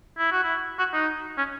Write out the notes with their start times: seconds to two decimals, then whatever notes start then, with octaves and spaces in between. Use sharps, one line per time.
0.19 E4
0.31 F#4
0.44 E4
0.79 F#4
0.94 D#4
1.38 C#4